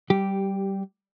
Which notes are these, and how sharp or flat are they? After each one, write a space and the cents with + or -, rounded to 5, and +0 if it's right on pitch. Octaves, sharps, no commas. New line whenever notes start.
G3 -15 G4 +0